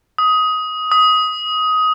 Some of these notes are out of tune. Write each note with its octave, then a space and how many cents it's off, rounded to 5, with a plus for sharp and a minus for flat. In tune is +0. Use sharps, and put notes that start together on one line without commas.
D#6 +15
D#6 +15